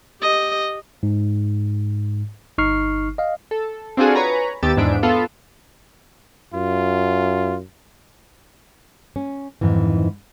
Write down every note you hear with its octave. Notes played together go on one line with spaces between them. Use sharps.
G4 D#5
G#2
G1 D#4 C#6 F6 C7
D#5 F5
A4
C4 D4 F4 F#4 G#4 A4
B4 C#5 G#5 A#5
D#2 B3 G4 D6 E6 A6
E2 G#2 D4 E5 D7
B3 F4 A4
F#2 F4
C#4
F2 G#2 D#3 E3